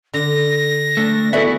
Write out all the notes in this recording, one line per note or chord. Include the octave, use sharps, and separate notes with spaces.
D3 A#6
A3 D4
B3 E4 F#4 G#4 A4 D5 E5